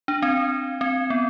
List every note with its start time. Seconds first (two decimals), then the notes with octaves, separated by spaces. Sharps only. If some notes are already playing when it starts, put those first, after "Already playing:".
0.08 D4
0.23 C4
0.81 C4
1.10 B3